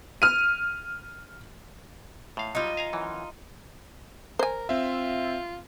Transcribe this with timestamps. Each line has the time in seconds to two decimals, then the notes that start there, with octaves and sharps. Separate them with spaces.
0.22 F6 D#7
2.37 A2 F5
2.55 F#3 G3 D#4 F4
2.77 F5 G#5 A#5
2.93 F#2 E3
4.39 A#4 C5 G#5
4.69 C4 F4 E5